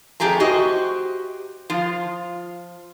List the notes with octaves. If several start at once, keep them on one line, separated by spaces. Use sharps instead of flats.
F2 A3 G4 G#4 A#5
F#4 G4 C5 D#5
F3 F4